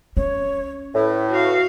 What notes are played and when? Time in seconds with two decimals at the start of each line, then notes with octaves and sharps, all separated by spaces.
0.17 C#4 C#5
0.95 A2 B4
1.29 F#4 F5